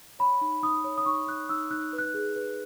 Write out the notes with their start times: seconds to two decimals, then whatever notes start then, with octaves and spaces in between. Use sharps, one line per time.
0.19 C#5 B5
0.41 D#4
0.63 D#4 D#6
0.84 C#5
0.98 D#6
1.06 D#4 C#6
1.27 D#4 F#6
1.49 D#4 E6
1.71 D#4 F#6
1.93 B4
1.98 F#6
2.14 G#4
2.36 B4